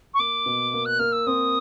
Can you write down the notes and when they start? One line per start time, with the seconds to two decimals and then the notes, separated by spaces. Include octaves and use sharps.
0.14 C#6
0.19 A#3 D6
0.46 B2
0.73 A#3
0.85 F#6
0.99 A#3 F6
1.12 E6
1.27 C4 D#6